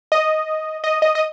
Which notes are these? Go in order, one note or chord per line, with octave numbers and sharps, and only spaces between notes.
D#5
D#5
D#5
D#5